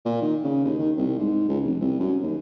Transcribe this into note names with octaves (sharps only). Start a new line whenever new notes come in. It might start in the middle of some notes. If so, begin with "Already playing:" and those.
A#2
D#3
C#3
D#2
D#3
C2
G#2
C#2
F1
C2
F#2
D#2